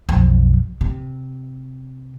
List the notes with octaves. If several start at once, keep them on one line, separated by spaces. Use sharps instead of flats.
B1 F2
C3